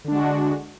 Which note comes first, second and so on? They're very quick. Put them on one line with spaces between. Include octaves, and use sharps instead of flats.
D3 D4 G#3 F#4